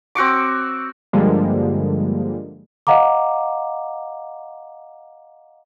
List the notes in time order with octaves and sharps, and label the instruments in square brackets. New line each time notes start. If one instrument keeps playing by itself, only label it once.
[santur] C4 F#4 C#6 D6
[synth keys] G2 D3 F3 G3 G#3 A#3
[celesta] D#5 F5 F#5 A#5 D6